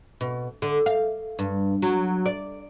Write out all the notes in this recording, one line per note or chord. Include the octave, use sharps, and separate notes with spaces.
B2
D3
F5
G2
F#3
D5